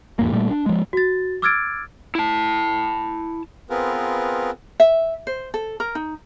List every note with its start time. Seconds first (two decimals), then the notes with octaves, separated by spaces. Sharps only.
0.19 E2 G#2 A#3
0.33 A#2 G3 A3
0.51 D4
0.66 F3 G#3
0.93 F#4 A6
1.42 D6 E6 F6 G#6 A6 D7
2.15 E4 A5
3.70 B3 C4 F4 G#4 A#4 B4
4.80 E5
5.27 C5
5.54 A4
5.80 A#4
5.95 D#4